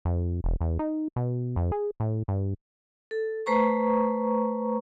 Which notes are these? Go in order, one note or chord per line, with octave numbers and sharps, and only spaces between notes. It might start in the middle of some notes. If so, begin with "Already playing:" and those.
F2
E1
E2
D#4
B2
F2
G#4
A2
G2
A4
A3 B4 C5 A#5 C#6